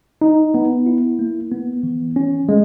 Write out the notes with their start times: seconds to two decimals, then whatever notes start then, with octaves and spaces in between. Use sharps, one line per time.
0.21 D#4
0.54 B3
0.86 E4
1.19 A#3
1.51 B3
1.83 E3
2.16 C#4
2.49 G#3